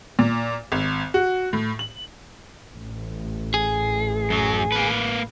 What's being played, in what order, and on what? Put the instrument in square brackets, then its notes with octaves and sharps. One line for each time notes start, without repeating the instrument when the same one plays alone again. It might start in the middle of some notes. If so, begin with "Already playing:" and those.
[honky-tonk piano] A#2
G#1
F#4
A2
F#7
[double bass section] A1
[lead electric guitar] G#4
[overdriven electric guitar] F#2 F#3
A#3 B4